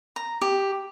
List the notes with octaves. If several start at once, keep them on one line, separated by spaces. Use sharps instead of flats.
A#5
G4